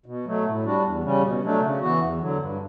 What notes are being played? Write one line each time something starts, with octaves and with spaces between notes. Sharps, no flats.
B2
F#3 A3
A2
G3 D4 F#4
E2
C#3 G3 C#4
B2
F#3 A3 D4
C#3
E3 B3 F#4
E2
D3 F#3
G2